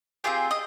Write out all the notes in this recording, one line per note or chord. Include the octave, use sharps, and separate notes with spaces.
C4 F4 G4 G#4 G5
D#5